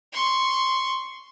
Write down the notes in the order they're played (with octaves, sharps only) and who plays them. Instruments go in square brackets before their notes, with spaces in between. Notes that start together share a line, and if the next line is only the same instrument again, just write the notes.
[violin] C6 C#6